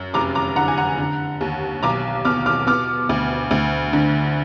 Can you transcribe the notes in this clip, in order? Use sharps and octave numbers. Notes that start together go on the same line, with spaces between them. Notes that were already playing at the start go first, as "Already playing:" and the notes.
Already playing: F#2
F1 A#5 D6
A#5 D6
D3 F#5 A#5
G#5
F#5 A#5
D3
D#2
B1 A#5 D6
B2 D6 F6
D6 F6
B3 D6 F6
D2
D2
D3